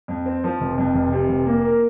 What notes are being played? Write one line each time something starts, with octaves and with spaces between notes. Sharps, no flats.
F2
C4
F3
F1
F2
F1
C3
F1
A#3
A#4